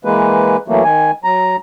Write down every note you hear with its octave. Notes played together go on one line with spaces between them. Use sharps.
E3 G#3 A#3 B4
E3 F#3 A3 A#3
D#3 G#5
F#3 A#5